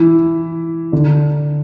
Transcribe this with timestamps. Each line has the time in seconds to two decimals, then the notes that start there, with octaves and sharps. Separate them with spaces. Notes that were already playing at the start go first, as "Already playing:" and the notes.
Already playing: E3 E4
0.92 D3 D4